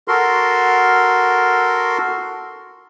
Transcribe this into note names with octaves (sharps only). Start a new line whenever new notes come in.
F#4 A4 A#4 C6